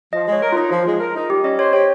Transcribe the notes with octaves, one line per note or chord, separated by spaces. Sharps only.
F3 D#5
G#3 C#5
A#4
D#4 F4
F3
G#3
A#4
D#4
G3 G4
C#4 D#5
C5 C#5
G4 C#5